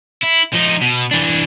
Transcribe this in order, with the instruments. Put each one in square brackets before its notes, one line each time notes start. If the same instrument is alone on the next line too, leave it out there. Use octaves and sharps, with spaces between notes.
[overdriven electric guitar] E4
F3 D#4
B2
E3 D4